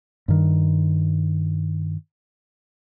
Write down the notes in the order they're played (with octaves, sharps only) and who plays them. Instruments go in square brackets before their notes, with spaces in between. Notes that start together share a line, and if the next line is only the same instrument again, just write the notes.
[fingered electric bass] G2 D#3